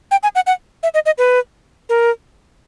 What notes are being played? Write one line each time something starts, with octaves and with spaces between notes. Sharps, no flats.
G5
G#5
F#5
F#5
E5
D#5
D#5
B4
A#4